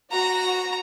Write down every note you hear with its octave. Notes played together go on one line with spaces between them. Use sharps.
F#4 A#5